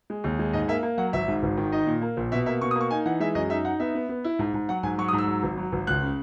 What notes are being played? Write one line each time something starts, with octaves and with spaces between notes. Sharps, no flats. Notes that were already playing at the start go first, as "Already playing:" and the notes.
G#3
D#2
G#3
G#2 D#5
A#3 E5
A#3
F#3 F#5
G#1 E5
G#2
G#1
D#3
D#4 D#5
A#2
A#3
A#1
B2 E5
A#3 E5
B2 C#6
D#6
A#3 C#6
D#4 G#5
E3 F#5
G#3 E5
F#2 D#5
D#4 E5
D#4 F#5
B3 E5
B3
B3
E4
G#2
G#2
F#3 F#5
G#2 G#5
F#3 C#6
D#6
G#2
E6
F#3
G#1
F#3
G#1
C#2 F#6
C#3